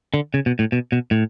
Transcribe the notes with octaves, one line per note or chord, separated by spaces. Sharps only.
D3
C#3
B2
A2
B2
B2
A2